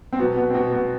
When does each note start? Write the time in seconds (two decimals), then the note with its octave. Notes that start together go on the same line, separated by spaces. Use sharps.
0.13 C4
0.19 B2 F#3 B3
0.37 B2 B3
0.50 C4
0.54 B2 B3
0.73 B2 B3